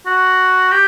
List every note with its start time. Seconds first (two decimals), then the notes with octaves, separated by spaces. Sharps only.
0.06 F#4
0.72 G4